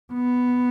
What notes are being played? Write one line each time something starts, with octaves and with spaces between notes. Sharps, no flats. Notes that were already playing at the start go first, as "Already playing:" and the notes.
B3